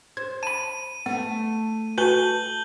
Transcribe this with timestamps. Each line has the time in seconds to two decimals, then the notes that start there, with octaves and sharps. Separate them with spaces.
0.17 C5 G#6
0.43 A5 B5 D#7
1.06 A3 B3
1.98 F#4 A4 B4 G#5 G6 F#7 G7